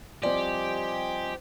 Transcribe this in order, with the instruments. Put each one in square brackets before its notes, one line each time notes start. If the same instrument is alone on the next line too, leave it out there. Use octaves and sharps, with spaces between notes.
[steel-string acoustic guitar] F3 G3 C4 [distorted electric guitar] G4 [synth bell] D5 [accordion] D#5 G#5 C6